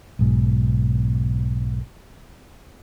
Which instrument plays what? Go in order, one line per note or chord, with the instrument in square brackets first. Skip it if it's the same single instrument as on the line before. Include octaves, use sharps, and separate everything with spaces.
[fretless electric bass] B1 G#2 B2